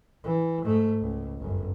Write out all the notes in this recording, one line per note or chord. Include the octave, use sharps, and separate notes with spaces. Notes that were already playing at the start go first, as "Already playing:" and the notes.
E3
G#2 A3
C#2
G1 F#2